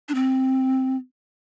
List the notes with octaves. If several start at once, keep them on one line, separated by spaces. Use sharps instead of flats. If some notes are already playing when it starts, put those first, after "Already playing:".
D4
C4